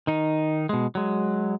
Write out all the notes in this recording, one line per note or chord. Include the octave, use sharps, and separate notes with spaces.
D#3 D#4
B2 G#3
F#3 G#3